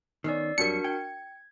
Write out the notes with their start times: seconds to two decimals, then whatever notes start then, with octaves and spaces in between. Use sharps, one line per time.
0.24 D#3 B3 C#4 D5 E6 C7
0.58 F2 F#3 G3 D4 F#4 A#4 C#7
0.84 G5 G#6